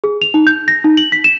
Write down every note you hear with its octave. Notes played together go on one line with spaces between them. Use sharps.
G#4
F7
D#4
G6
A#6
D#4
F#7
B6
E7